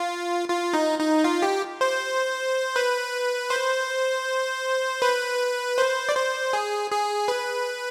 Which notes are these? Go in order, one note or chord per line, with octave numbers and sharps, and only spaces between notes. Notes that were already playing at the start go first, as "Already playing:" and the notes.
Already playing: F4
F4
D#4
D#4
F4
G4
C5
B4
C5
B4
C5
D5
C5
G#4
G#4
B4